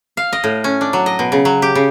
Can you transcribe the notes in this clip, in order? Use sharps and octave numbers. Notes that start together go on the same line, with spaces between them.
F5
D#5
A2
C#4
D4
F#3
D#5
B2
C#3
F#3
G4
C#3